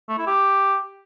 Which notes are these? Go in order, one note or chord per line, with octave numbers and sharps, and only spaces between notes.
A3
E4
G4